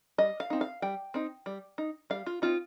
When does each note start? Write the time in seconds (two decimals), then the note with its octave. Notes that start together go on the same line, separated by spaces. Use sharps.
0.18 G3 D#5
0.40 F5
0.50 C4 D#4
0.61 F5
0.82 G3 G5
1.14 C4 D#4
1.46 G3
1.78 D#4
2.10 G3 F5
2.26 F4
2.42 C4 D#4 F4